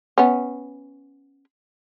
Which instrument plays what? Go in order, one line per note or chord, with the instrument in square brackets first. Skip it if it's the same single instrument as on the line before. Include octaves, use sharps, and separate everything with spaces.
[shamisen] B3 C#4